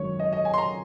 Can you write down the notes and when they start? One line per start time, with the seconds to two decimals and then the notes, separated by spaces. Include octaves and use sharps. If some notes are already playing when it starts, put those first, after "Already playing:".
Already playing: G#1 F#2 D#3 F#3 C#5
0.19 D#5
0.33 D#5
0.45 G#5
0.54 C6
0.58 A#5